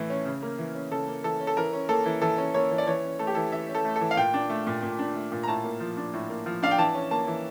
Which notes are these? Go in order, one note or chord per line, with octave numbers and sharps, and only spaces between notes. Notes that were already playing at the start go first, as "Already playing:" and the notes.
Already playing: A2 E3 A3
C#4
C#3
A#3
E3
C#4
C#3 A4
A#3
E3 A4
C#4
A4
E3 A#4
C#4
A#3 A4
E3
E3 A4
C#4
A#3 C#5
E3
D5
E3 C#5
C#4
A3 A4
G4
E3 A4
E3 E5
C#4
A4
A3
E3 A4
F5
A#2 G5
D4
A3
A#2
A#2
D4
A3
A#2
A#5
A2 A5
A#3
F3
D4
A2
A#3
F3
D4 F5
G5
E3 A5
C#4
A#3 A5
E3